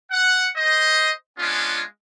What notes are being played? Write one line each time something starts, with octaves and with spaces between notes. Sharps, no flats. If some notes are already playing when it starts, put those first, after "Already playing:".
F#5
C5 D#5
G#3 B3 C#4 D4 F4